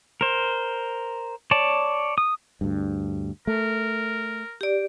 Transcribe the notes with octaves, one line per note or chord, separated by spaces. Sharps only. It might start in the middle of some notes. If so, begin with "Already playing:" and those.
A#4 C5
C#5 D5 A5
D#6
D2 G2
A3 A#4
G4 D5